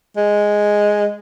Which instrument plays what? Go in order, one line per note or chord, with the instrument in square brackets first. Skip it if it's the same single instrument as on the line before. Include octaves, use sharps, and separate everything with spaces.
[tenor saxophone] G#3